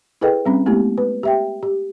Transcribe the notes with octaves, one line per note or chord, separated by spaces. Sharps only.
E4 G#4 A4 B4 D#5 G5
G3 C4 C#4
G#3 A3 B3 E4 G4
B4
G4 E5 G5
G4